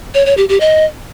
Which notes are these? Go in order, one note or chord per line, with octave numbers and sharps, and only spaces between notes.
C#5
C#5
G4
G4
D#5